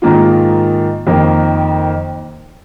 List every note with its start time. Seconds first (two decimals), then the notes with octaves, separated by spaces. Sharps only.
0.02 G#2 D#3 A#3 F4
1.07 F2 D#3 A#3